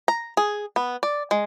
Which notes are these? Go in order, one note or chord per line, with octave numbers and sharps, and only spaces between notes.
A#5
G#4
B3
D5
G#3